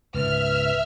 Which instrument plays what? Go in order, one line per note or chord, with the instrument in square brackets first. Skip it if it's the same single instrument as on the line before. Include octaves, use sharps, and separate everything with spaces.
[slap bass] C#2 G#2 [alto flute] B4 [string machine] E5 [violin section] F6